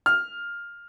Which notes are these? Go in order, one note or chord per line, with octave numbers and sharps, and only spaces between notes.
F6